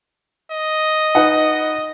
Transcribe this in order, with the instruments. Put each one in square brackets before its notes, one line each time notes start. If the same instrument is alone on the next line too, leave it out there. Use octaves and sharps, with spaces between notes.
[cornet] D#5
[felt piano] D#4 B4 F#5